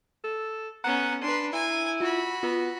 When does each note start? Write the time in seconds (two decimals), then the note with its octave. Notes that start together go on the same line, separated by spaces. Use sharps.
0.24 A4
0.84 B3 C#4 F#5 A#5
1.23 D4 B4 C6
1.53 E4 G#5
2.01 F4 F#4 B5
2.43 B3 F4